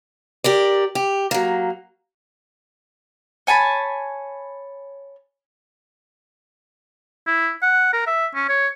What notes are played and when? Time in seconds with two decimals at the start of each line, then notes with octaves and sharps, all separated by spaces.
0.44 G4 A#4 D5
0.95 G4
1.31 F#3 A#3
3.47 C#5 G#5 A5 B5
7.27 E4
7.62 F#5
7.93 A#4
8.07 E5
8.35 C#4
8.49 C#5